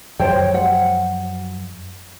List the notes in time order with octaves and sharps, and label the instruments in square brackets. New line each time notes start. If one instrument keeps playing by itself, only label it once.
[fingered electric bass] F#2 F3 F#3 [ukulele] C5 C#5 G5
[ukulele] F#5